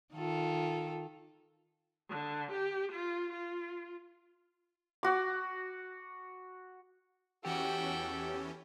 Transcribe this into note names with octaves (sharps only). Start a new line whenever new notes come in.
D#3 F4 A4
D3
G4
F4
F4
F#4 D6
E2 E3 C#4 F#4 G4 A4 G5